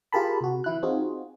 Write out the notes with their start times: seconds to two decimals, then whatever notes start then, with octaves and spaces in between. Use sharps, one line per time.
0.12 F4 G4 G#4 A#4 A5 B5
0.41 C3 F#4
0.64 E3 E4 F#6
0.83 C4 D#4 F4 F#4 G#4